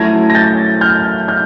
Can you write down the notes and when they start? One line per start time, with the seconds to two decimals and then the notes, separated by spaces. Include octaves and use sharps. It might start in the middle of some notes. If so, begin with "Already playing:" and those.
Already playing: F#3 A3 C#4 E4 G#6 A#6
0.30 A#6
0.35 G6 A6
0.81 F6 G6
1.28 F6 G6